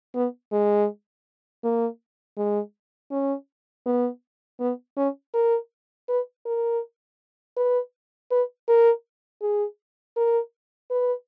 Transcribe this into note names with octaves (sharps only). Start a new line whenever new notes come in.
B3
G#3
A#3
G#3
C#4
B3
B3
C#4
A#4
B4
A#4
B4
B4
A#4
G#4
A#4
B4